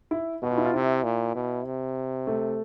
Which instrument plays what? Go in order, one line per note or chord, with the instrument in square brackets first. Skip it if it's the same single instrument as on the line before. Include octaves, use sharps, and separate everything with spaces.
[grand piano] E4
[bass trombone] B2 [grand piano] F#4
[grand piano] F4
E4
F4
[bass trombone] C3 [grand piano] E4
[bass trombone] A#2
B2
C3
[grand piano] A3